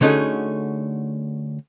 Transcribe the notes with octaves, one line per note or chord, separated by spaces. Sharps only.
D3 A3 C#4 D#4 F#4 G#4